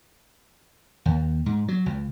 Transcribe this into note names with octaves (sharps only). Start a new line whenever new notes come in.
D#2
G#2
F#3
C#2